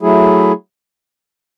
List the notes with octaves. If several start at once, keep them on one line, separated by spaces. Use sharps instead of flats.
F#3 A3 E4 G#4